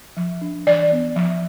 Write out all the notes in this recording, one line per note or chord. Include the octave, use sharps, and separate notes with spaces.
F3
D4
E3 D5
B3
F3